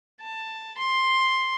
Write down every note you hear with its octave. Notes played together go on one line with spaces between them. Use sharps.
A5
C6